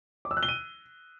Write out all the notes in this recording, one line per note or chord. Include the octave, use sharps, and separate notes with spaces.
D6
E6
F#6
G7
D#7